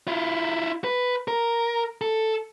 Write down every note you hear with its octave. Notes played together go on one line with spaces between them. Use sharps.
E4 F4
B4
A#4
A4